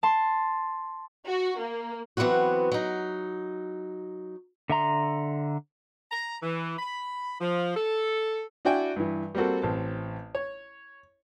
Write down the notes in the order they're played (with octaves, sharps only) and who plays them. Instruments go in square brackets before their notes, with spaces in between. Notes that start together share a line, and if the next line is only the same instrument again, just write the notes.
[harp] A5 C6
[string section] F#4
A#3
[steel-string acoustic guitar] E3 F#3 B3 C4 F#4
F#3 D#4
[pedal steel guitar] D3 E5 A#5 C6
[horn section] A#5
E3
B5
F3
A4
[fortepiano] D4 E4 F#4 D5 G5 G#5
G2 E3
G3 A#3 C4 F#4 A4
A1 C4 A5
C#5